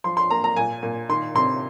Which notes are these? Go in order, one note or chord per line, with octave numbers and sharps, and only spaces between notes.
F3 C6
C6
A#3 A#5
A#5
A#2 G#5
A#2
D#3 C6
C3 C6